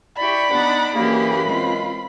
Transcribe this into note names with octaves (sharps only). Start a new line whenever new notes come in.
E4 G4 D5 B5 C#6
B3 D4 D#4 F#5 D6
F#2 E3 A#3 G4 G#4 B5
G#3 C4 F4